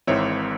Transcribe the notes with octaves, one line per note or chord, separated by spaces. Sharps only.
G#1 G#2 E3 C4 D#4 C#5 E5